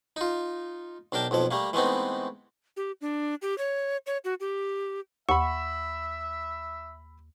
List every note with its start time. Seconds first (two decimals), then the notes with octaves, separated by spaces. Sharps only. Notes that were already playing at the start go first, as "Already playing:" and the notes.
0.16 D#4 F4
1.12 B1 D4 A#4 G5 A5
1.31 B1 F2 F3 A4
1.51 G3 A3 A#3
1.73 E3 G#3 A3 B3 C4 D#4
2.77 G4
3.01 D4
3.42 G4
3.58 C#5
4.07 C#5
4.25 F#4
4.40 G4
5.29 D#2 E5 F#5 B5 C#6 E6